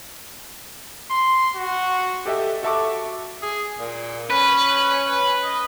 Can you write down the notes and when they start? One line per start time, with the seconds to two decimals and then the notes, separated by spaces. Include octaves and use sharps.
1.11 C6
1.56 F#4
2.26 G4 A4 D#5 E5 G5
2.63 F#4 A4 E5 A5 C#6 D6
3.42 G#4
3.77 A#2
4.30 C#4 B4
5.43 D#5